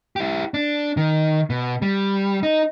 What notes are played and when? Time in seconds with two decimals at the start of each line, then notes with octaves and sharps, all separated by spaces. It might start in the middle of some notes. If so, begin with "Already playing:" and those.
0.16 E4 G4
0.54 D4
0.97 D#3
1.50 B2
1.82 G3
2.43 D#4